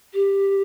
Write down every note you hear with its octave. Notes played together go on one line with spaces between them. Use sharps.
G4